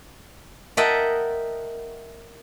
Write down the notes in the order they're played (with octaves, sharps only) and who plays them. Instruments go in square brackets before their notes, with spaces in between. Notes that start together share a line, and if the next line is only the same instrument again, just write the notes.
[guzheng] A#4 D#5 E5 F#5 G5 A5